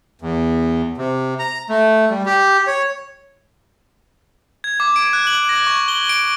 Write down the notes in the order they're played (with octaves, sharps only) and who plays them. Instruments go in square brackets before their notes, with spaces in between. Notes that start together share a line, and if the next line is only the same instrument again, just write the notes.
[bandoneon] E2
C3
A#5
A3
G3
G4
C#5
[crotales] G#6
D6
D7
F#6
F#7
A#6
C#6
G7
D7